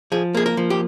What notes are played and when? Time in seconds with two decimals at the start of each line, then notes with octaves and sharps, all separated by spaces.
0.12 F3 G#4
0.35 A#3 G#4
0.46 A#4
0.57 F3
0.70 G4